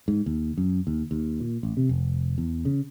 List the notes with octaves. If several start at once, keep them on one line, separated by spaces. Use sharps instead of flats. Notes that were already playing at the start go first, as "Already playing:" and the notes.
G#2
D#2
F#2
D#2
D#2
A#2
A1
C3
F1
E2
C#3